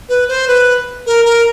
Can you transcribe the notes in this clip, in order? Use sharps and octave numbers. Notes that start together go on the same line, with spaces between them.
B4
C5
B4
A#4
A#4